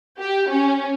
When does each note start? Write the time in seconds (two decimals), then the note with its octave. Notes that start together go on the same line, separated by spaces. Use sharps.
0.19 G4
0.49 C#4